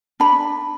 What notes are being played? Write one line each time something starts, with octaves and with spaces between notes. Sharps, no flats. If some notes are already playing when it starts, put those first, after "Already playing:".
D4 B5